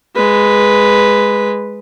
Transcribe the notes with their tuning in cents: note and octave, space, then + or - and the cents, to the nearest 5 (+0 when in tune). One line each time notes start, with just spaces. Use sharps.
G#3 +0 B4 +0